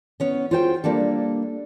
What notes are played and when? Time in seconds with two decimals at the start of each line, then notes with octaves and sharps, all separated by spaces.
0.20 B3 C#4 C#5
0.51 F4 F#4 G#4 C5 F5 G5
0.84 G3 A#3 D4 A4